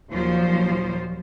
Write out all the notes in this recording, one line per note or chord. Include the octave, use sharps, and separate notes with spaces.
D#2 A#2 F3 F#3 C5